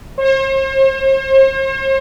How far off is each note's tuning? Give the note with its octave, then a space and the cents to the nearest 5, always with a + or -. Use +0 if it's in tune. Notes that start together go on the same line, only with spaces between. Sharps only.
C5 +45